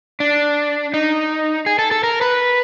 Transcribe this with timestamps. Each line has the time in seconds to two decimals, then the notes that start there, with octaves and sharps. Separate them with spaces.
0.20 D4
0.94 D#4
1.66 G#4
1.79 A4
1.91 A4
2.04 A#4
2.21 B4